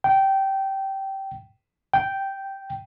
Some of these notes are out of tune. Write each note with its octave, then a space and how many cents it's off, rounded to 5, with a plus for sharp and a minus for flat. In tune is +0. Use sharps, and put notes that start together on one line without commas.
G5 -15
G5 -5